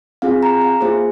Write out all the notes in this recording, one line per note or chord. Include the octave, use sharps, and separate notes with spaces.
C4 F4 G#4 F5
A#5
F5
A#3 F4 G#4 C5